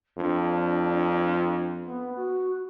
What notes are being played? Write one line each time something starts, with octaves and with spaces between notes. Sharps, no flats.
F2 D4
B3
F#4